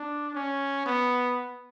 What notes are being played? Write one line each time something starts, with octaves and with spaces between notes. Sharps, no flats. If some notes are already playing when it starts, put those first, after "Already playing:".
Already playing: D4
C#4
B3